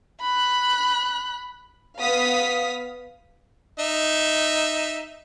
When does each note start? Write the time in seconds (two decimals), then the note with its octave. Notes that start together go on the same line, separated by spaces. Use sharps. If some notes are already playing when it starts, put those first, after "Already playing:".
0.20 B5 F#6
2.00 B3 F5 D#6 B6
3.79 D#4 E5